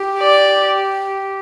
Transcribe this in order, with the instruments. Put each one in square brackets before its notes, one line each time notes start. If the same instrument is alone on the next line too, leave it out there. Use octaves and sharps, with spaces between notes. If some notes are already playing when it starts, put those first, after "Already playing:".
Already playing: [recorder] G4
[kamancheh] D5